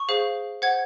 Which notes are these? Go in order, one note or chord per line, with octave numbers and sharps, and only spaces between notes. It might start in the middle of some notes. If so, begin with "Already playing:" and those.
Already playing: C#6
G#4 C5 F5
C5 F#5 G#6